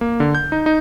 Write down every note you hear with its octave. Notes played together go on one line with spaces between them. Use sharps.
A#3
D3
G6
D#4
D#4